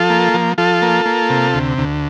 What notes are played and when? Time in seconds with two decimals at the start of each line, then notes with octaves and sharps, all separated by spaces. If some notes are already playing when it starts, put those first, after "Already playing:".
Already playing: F3 F4 A4
0.10 A#3
0.34 F3
0.58 F3 F4 A4
0.82 A#3
1.06 A#3
1.30 C3
1.54 D2
1.78 D2